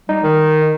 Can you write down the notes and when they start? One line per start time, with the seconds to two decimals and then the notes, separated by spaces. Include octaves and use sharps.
0.09 G3 D#4
0.23 D#3